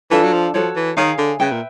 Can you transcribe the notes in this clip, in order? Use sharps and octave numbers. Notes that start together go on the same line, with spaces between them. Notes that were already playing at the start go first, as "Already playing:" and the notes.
E3 D4 F4 A4
F#3
F3
F3 F#4 A4 C#5
E3
D#3 G#4 C#5 F5 G#5
D3
C#3 B4 E5 G5
A#2